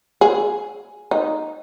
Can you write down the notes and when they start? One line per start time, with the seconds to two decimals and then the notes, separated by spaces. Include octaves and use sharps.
0.21 G#4
1.11 D#4